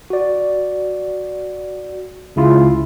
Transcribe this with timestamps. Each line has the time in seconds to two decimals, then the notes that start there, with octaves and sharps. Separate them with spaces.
0.10 F#4 D5
2.36 C#2 C#3 E4 F4